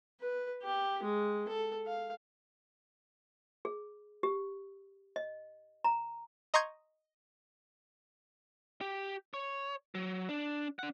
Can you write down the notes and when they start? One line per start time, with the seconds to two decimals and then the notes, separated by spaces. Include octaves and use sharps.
0.21 B4
0.63 G4
1.03 G#3
1.49 A4
1.87 F5
3.65 G#4
4.23 G4
5.16 D#5
5.84 A#5
6.54 D#5 A#5 C6 C#6 G6 G#6
8.81 G4
9.34 C#5
9.95 F#3
10.29 D4
10.79 D4 F#5